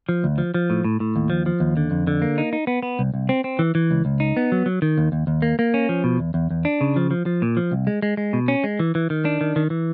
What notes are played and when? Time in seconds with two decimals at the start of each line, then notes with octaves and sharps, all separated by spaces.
0.09 F3
0.24 D2
0.38 F3
0.54 F3
0.70 A2
0.85 A2
1.00 A2
1.16 D#2
1.30 F3
1.46 F3
1.60 D#2
1.77 D3
1.91 F2
2.07 D3
2.22 A#3
2.38 D#4
2.53 D#4
2.67 B3
2.83 B3
2.99 C2
3.14 C2
3.29 C4
3.44 C4
3.59 E3
3.75 E3
3.91 C#2
4.05 C#2
4.20 D#4
4.37 B3
4.52 F#3
4.66 F#3
4.82 D#3
4.98 D#2
5.12 D#2
5.27 D#2
5.42 A#3
5.59 A#3
5.74 C#4
5.89 F3
6.04 B2
6.19 E2
6.34 E2
6.50 E2
6.65 D4
6.81 C#3
6.96 F3
7.11 F3
7.26 F3
7.42 A#2
7.57 F3
7.72 C2
7.87 G#3
8.02 G#3
8.17 G#3
8.33 B2
8.48 C#4
8.64 G#3
8.80 E3
8.95 E3
9.10 D#3
9.25 D4
9.41 D#3
9.56 D#3
9.70 E3